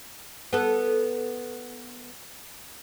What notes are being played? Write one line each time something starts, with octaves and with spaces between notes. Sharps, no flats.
B3 A4